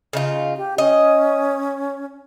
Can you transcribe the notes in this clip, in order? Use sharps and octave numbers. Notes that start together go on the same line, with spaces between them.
C#3 D#4 F4
G4
C#4 D#5